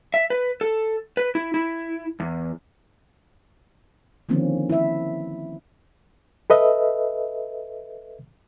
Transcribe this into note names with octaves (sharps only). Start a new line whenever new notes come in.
E5
B4
A4
B4
E4
E4
E2
D3 D#3 F3 A#3 C4 C#4
E4 E5
A4 B4 D#5 E5